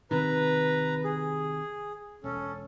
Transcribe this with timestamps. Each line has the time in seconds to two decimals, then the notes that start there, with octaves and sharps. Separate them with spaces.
0.11 C3 D#3 B4 A#5
1.04 G#4
2.24 E1 C#4 A4